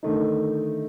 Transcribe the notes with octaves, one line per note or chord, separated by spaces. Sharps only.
D3 D#3 A3 D#4